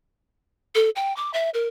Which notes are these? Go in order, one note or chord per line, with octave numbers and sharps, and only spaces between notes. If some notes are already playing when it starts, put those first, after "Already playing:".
A4
G5
D6
E5
A#4